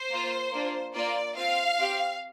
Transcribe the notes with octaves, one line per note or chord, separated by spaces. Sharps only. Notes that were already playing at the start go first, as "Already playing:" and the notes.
Already playing: C5
A#3 F4
A#3 D4 F4
A#3 F4 D5
C4 F4 F5
C4 G4